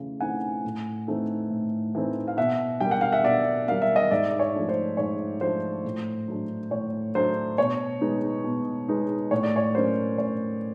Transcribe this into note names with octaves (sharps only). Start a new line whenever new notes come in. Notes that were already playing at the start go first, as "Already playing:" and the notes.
Already playing: C#3 E3 A3
E3 A3 C4 D#4 F#5 G#5
A2
E3 A3 C4 D#4
A2
E3 A3 C4 D#4
F5
B2 E5 F#5
G3 A#3 G5
F#5
F5
E5 F#5
B2 D5 E5
G3 A#3 F5
E5
D#5 F5
G#2 D5 E5
D5
C#5
F3 A3 D4
C5
G#2 C#5
F3 A3 D4 C5
A2
F#3 A3 D4
A2 C#5
F#3 A3 D4 C5
B2 C#5
G#3 B3 D#4
B2
G#3 B3 D#4
A2 C#5
D5
C#5
F#3 A#3 C#4 C5
A2 C#5